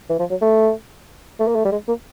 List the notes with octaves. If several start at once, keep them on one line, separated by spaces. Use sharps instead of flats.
E3
F3
F#3
A3
A3
A#3
A3
G3
G#3
A#3